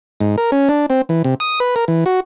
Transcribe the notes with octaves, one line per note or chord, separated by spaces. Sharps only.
G#2
A#4
C#4
D4
C4
E3
C3
D#6
B4
A#4
E3
F#4